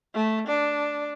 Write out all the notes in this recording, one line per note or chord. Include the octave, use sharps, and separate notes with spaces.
A3
D4